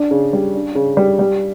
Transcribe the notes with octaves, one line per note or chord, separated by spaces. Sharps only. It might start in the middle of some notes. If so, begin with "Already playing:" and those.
Already playing: D4
C#3
G3
D4
C#3
G3
G3